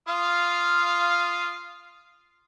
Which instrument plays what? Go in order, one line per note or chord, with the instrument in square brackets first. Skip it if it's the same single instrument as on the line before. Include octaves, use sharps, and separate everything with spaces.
[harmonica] F4 F5 D#6